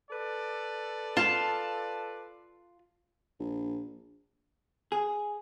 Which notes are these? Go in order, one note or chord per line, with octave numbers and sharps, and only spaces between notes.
A4 B4 D5
F4 A5
A#1
G#4